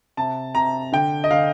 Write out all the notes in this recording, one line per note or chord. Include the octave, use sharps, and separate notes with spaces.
C3 A5
C3 A#5
D3 G5
D#5
D3 F5